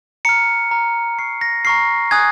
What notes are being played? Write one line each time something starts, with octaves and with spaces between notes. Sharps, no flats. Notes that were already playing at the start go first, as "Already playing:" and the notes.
A#5 F6 C#7
A#5 F6
A#5 C#6 F6 C7
A#6
A#5 C#6 F6 C7
G#5 D#6 F#6 G#6